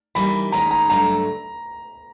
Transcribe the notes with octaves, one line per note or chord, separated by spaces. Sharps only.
E3 G3 A#3 D#4 B5
D#2 D#3 G#3 C#4 A#5
A#5
G2 D3 F#3 A3 A#5